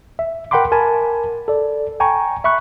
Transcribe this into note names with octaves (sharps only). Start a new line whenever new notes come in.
E5
A#4 F#5 G5 B5 C6 D6
A#4 G#5 A5 B5
A4 D5
G5 G#5 A#5 C#6
E5 B5 C#6 F#6